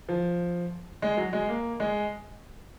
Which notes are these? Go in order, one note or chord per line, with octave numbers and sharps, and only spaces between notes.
F3
G#3
F#3
G#3
A#3
G#3